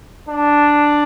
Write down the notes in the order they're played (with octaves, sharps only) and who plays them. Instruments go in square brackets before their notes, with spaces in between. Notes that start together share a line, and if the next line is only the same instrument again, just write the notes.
[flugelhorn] D4